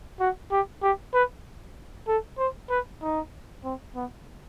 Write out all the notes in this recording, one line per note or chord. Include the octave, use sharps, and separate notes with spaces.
F#4
G4
G4
B4
A4
C5
B4
D#4
C4
B3